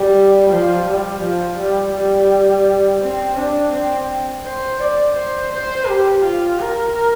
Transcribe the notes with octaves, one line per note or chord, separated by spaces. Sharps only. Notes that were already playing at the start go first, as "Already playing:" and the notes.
Already playing: G3
F3
G3
F3
G3
G3
C4
D4
C4
C5
D5
C5
C5
G4
F4
A#4